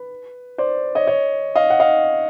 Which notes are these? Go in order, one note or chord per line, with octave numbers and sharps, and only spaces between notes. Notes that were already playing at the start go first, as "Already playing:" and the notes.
Already playing: B4
C5 D5
C#5 D#5
C#5 D#5
D#5 F5
F#5
D#5 F5